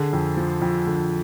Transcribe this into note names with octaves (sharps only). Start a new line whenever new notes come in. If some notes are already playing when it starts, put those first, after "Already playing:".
Already playing: D3 G#4
F2
F3
F2
D3